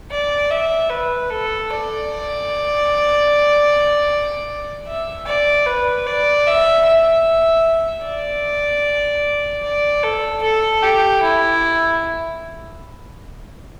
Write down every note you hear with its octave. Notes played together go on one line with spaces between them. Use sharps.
D5
E5
B4
A4
D5
E5
D5
B4
D5
E5
E5
D5
D5
A4
A4
G4
E4